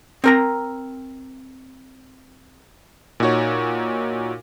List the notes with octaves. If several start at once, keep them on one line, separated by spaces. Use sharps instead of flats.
C4 A#4 A#5
A#2 D#4 F#4 C#5